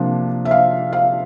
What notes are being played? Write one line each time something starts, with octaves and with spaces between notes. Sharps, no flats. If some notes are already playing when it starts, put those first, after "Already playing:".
Already playing: C3 F3 A#3 D4
E5
F5
F5